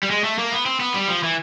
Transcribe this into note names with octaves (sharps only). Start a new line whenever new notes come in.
G3
G#3
A3
A#3
B3
C4
B3
G3
F3
E3